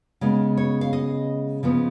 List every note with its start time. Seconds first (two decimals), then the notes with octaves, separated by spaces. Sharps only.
0.21 C#3 G#3 B3
0.57 C#5
0.81 F5
0.93 D#5
1.63 C#3 F3 B3